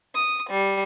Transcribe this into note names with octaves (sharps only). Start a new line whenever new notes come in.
D#6
G3